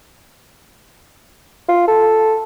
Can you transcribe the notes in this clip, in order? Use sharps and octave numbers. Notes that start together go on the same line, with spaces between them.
F4
A4